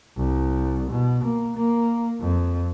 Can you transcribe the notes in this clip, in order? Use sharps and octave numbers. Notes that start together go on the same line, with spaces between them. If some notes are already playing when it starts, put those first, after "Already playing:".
C2
B2
A#3
A#3
F2